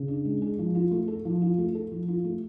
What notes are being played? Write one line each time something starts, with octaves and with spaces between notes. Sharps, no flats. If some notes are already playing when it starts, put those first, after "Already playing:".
Already playing: C#3
D4
G#3
G#4
F3
F4
A3
A4
F3
F4
A3
A4
F3
F4
A3